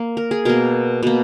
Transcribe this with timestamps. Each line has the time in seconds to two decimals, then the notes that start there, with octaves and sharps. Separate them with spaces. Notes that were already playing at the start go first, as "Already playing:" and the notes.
Already playing: A#3
0.17 A#4
0.31 G#4
0.45 B2 A#3 A#4
1.03 B2 A#3